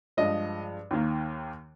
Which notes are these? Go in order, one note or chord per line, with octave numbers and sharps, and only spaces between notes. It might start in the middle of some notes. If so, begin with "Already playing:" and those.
G2 F3 G#3 D#5
D#2 D#3 A#3